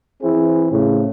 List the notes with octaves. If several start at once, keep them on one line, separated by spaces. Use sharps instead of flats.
E3 C4 E4 G#4
A2 C#3